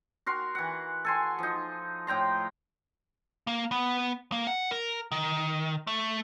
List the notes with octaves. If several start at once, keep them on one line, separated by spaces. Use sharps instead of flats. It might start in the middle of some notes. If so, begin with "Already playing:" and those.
F#4 A#4 C6
E3 F#5
A4 G#5 C6
F3 D#4
A2 G5 A#5 C6
A#3
B3
A#3
F#5
A#4
D#3
A3